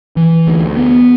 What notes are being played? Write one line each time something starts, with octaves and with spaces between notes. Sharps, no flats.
E3
D2
B3